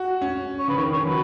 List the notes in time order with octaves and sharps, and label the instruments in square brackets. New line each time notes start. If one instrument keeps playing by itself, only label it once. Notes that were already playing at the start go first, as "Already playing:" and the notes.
Already playing: [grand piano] F#4
C#4
[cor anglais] C#5
[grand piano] C#3 [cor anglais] B4
[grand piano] D#3 [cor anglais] C#5
[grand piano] D#3 [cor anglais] C#5
[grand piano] D#3
[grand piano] F#3 [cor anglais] B4